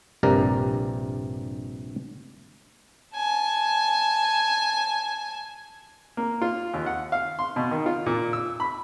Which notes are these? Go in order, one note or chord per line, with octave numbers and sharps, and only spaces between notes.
A#1 G2 C3 A#4 D5
G#5 A5
A#3
F4
D#2
F#5
F5
C6
B2
D#3
F4
A#2
E6
B5